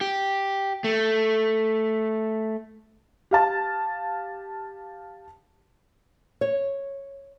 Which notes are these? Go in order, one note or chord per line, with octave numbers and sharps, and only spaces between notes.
G4
A3
G4 F5 A5
C#5